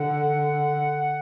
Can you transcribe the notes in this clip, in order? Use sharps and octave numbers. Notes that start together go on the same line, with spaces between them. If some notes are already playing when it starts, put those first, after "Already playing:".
Already playing: D3 F#5